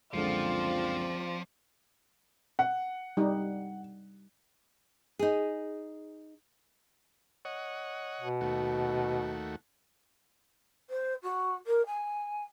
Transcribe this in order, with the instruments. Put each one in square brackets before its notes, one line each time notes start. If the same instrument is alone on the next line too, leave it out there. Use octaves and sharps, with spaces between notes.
[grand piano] F#1 C#2 D3 [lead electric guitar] F3 [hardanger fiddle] C4 D5 [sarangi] F4
[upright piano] F#5
[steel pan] G3 D#4
[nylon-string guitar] D#4 G#4
[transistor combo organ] C#5 D#5 F#5
[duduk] B2
[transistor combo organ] D#2 A3 F#4
[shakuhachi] C5
F#4
A#4
G#5